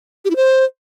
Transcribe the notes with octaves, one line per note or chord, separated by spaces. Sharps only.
G4
E4
C5